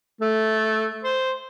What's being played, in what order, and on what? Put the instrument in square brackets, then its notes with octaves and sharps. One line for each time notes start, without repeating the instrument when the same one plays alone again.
[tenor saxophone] A3
C5